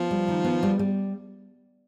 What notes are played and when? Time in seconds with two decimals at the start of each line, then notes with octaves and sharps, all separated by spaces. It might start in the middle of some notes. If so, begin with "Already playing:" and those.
Already playing: F3 B3
0.11 G3
0.28 D#3
0.44 B3
0.63 G3
0.79 G3